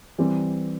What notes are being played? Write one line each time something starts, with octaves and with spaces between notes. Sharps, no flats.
E3 G3 C4